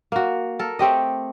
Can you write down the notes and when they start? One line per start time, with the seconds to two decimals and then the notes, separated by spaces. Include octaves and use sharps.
0.12 A#3 F#4
0.59 A4 A#4
0.79 A3 C4 G4 D#5